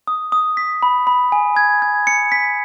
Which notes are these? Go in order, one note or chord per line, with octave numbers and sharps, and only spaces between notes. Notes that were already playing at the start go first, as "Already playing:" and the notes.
D#6
D#6
B6
B5
B5
G#5
G#6
G#6
C#7
B6